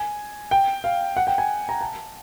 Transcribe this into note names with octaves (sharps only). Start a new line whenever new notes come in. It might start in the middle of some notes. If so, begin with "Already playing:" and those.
Already playing: G#5
G5
F5
F#5
G5
G#5
A#5
A5